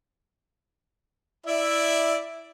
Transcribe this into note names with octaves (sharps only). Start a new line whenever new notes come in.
E4 D5 E5